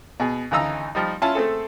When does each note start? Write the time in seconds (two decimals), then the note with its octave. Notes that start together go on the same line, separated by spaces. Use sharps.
0.20 B2 G#4
0.51 D2 C#3 E3 D#4 A#5 E6
0.95 F3 G3 D#4
1.22 C#4 E4 F4 A5 C6
1.35 A3 C4 G#4 A4